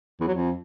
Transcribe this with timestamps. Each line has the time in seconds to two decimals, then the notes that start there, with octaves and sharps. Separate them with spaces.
0.20 E2
0.27 F#3
0.35 F2